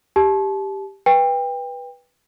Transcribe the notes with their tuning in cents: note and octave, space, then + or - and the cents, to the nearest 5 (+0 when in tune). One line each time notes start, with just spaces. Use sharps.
G4 +0 A5 -35
B4 -10 G5 +25